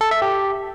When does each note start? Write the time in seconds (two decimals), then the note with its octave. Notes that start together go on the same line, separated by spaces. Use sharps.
0.01 A4
0.11 E5
0.22 G4